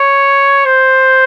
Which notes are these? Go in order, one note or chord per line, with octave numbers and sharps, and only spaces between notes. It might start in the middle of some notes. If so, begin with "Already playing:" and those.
Already playing: C#5
C5